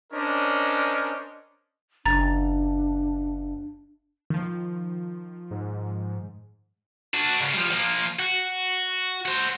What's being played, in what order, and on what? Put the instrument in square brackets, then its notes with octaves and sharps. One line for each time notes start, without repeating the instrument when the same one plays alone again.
[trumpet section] C#4 D4 A#4 C5 D#5
[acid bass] F#1 [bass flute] D4 [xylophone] A#5 A6
[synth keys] D#3 F3
[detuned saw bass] G#2
[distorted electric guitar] D4 F#4
G#2 C#3
F3 G3
F3 A#3
F#4
F#4 C5